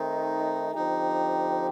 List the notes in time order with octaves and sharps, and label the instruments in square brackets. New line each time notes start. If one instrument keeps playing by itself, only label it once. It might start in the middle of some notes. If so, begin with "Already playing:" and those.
Already playing: [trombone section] D#3 A3 C4 [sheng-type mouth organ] D#4
[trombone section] D3 F3 C4 G4 [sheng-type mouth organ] D#4